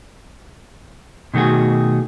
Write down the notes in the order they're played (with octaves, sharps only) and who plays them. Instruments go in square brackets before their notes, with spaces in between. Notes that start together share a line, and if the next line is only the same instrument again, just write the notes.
[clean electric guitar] B2 D#3 A3 F#4 G#4